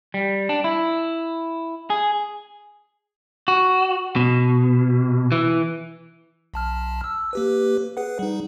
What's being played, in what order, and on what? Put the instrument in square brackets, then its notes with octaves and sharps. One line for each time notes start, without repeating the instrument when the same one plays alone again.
[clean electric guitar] G3
D4
E4
G#4
[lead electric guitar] F#4
B2
E3
[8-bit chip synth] B1 A5 F6
E6
A#3 G4 B4
G#4 B4 F#5
G3 D#4